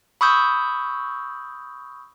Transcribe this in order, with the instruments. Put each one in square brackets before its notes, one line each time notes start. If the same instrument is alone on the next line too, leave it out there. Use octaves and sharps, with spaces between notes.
[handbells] B5 C#6 D#6 E6 G6